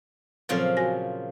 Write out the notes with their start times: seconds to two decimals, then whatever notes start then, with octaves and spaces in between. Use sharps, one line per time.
0.49 A#2 C#3 F3 F#3 C4 A4
0.77 F#4 G#5 A#6